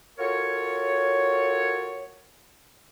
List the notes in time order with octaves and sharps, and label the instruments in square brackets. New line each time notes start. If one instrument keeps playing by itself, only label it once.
[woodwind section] F4 F#4 A4 A#4 C#5